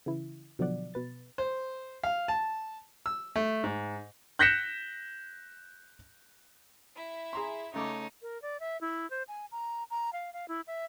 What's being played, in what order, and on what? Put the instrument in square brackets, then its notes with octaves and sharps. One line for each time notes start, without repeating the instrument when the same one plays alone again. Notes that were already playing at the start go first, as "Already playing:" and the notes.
[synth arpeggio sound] C#3 E3 E4
B2 D3 F3 F#3 D5 F#5
B2 B4 A6
[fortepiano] C5
F5
A5
E6
A3
G#2
[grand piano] F#6 G6 A#6 B6 C#7 E7
[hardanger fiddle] E4 E5
[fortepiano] G#4 A#5 C6
[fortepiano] C#3 A3 D6 [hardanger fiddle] D#4 C#5
[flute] A#4
D5
E5
E4
C5
G#5
A#5
A#5
F5
F5
E4
E5